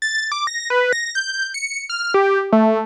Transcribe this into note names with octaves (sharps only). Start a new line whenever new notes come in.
A6
D6
A#6
B4
A#6
G6
C#7
F6
G4
A3